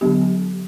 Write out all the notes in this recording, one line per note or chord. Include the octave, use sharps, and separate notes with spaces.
D3 F#3 B3 D4 G4